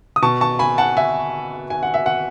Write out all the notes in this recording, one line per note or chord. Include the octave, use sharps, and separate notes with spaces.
D#6
B2 A5 C#6
A5 C#6
G#5 B5
F#5 A5
E5 G#5
G#5
F#5
E5
F#5